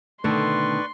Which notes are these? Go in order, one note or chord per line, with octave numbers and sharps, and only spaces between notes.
B2 D3 D#3 A3 B4 D5 C6 C#6